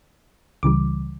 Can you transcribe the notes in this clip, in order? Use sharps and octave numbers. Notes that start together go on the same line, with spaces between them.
C#2 C#3 E3 G3 D6